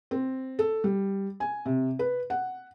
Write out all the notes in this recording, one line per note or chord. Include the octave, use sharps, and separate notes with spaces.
C4
A4
G3
G#5
C3
B4
F#5